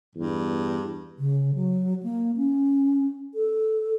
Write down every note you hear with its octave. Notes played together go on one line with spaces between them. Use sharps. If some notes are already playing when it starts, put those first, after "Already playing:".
E2 G2
C#3
F#3
A#3
C#4
A4